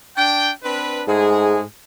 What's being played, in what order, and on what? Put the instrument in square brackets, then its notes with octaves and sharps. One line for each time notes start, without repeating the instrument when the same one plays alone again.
[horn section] D4 G5
C4 D4 B4
[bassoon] G#2 [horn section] G#3 A3 G#4